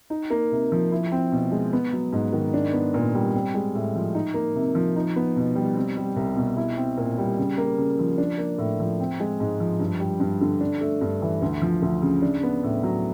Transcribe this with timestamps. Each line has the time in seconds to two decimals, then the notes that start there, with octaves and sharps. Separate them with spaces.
0.10 D#4
0.30 A#3
0.52 C3
0.72 F3
0.92 E4
1.12 C4
1.32 B2
1.52 G#3
1.73 B3
1.93 F#3
2.13 G#2
2.33 D#3
2.54 D4
2.73 B3
2.94 A#2
3.14 G3
3.34 C4
3.54 G#3
3.75 A2
3.95 F3
4.15 D#4
4.34 A#3
4.55 C3
4.75 F3
4.96 D#4
5.16 B3
5.36 B2
5.55 G3
5.76 C4
5.97 G3
6.16 C2
6.37 B2
6.57 E4
6.77 C4
6.97 A#2
7.18 G3
7.38 C#3
7.58 A#3
7.78 C#3
7.99 F3
8.18 D4
8.38 A#3
8.58 A2
8.80 F3
9.00 C4
9.20 G#3
9.40 G#2
9.60 F3
9.79 G2
10.00 G3
10.20 G2
10.41 D3
10.61 D4
10.81 A3
11.01 G2
11.22 E3
11.42 D2
11.62 F3
11.82 D2
12.02 C#3
12.22 D4
12.43 B3
12.63 A2
12.83 F#3